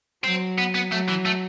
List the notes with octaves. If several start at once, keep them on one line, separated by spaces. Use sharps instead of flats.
F#3 C4
B3
B3
F#3 A3
E3
A3